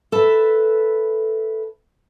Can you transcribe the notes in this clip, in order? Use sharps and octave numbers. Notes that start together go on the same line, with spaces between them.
A4 B4 E5